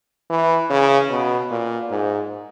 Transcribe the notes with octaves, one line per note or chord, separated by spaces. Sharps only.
E3
C#3
B2
A#2
G#2